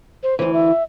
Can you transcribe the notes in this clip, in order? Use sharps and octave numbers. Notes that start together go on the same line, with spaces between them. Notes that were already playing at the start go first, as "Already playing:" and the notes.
C5
D2 E3 C5
E5